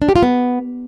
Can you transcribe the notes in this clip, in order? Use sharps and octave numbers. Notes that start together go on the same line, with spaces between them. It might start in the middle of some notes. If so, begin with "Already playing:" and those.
D4
G4
F4
B3